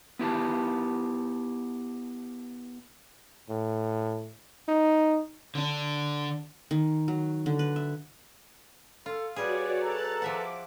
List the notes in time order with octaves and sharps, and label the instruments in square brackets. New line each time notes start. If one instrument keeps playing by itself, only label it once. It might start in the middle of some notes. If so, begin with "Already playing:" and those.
[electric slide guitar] B3 E4 G4 A5
[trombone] A2
D#4
[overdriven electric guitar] D3 D4
[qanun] D#3
F#3
D3
B4
E5
[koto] F4 [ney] A4
[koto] G3 G#4 [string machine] F#4 C#5 D5 [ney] B4
[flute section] A4 A#5 [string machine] F#6 A6
[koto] F3 E5 F#5 [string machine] D6